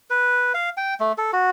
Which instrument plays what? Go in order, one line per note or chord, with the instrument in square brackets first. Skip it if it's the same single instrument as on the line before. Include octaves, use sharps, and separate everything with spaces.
[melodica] B4
F5
G5
A3
A4
F#4